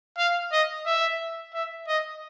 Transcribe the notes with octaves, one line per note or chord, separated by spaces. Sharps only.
F5
D#5
E5
E5
D#5